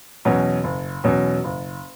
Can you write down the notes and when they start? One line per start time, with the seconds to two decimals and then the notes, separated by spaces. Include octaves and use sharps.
0.25 E2 B2 F#3 C#4
0.64 F#1
1.04 E2 B2 F#3 C#4
1.44 F#1